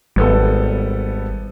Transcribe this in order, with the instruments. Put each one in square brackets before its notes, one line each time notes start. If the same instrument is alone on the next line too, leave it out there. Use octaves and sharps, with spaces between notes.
[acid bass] G#1 [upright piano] G3 B3 A4